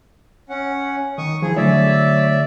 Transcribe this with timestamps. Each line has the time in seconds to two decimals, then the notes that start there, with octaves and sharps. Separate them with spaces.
0.49 C#4 F#5
1.18 D#3 C#6 D#6
1.42 D#2 E3 F3 G#4
1.56 D3 F#3 A3 C#5 D5 E5